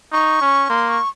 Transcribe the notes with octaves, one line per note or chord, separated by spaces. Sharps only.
D#4 C#6
C#4
A#3 C6
C#6